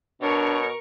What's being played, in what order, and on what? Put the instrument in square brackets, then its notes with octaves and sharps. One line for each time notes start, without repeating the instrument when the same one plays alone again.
[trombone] B2 [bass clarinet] D4 [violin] A#4 C#6 [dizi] C#5